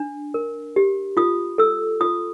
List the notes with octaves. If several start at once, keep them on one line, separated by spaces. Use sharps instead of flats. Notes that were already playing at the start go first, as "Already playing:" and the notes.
Already playing: D4
A#4
G4
F4 D#6
A4 E6
F4 D#6